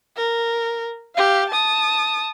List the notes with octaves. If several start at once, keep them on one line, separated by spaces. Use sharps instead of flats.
A#4
G4 F5
A5 D#6